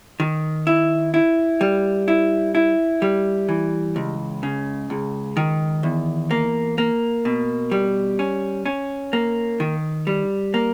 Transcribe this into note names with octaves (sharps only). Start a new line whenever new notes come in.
D#3
E4
E4
G3
E4
E4
G3
E3
C#2
C#3
C#2
D#3
E2
A#3
A#3
B2
G3
C#4
C#4
A#3
D#3
G3
A#3